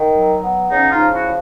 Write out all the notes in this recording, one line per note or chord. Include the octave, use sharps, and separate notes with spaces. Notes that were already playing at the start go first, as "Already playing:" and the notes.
Already playing: D#3
F#3
B3
C#3 C#4 D#4
D#4 F4
F3
E4 F#4